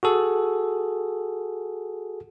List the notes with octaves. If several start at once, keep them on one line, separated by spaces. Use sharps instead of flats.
F#4 G#4 A4